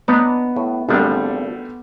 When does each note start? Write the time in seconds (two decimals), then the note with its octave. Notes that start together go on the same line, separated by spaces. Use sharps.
0.08 B3 D4 D#4 B4
0.56 A2
0.89 G#1 D3 F3 G3 A3 D4